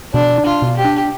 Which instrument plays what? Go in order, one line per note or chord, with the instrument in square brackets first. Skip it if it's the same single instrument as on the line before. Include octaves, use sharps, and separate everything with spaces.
[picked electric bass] B2 [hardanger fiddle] D4
[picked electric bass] D4
[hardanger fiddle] F4
[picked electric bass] B2
[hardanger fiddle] G4
[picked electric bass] D4